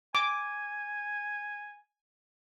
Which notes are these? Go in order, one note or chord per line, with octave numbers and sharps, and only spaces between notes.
G#5 D6